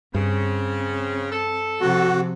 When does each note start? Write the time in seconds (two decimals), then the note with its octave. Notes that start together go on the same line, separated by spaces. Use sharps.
0.14 G2 C#3 C4
1.31 A4
1.81 C3 F3 F#4